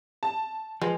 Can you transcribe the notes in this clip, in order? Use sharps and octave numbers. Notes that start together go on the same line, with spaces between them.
A5
F3 G#3 B4 G#5